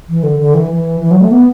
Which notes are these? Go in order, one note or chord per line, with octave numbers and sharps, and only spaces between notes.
E3
D3
D3
E3
E3
E3
F#3
A3
B3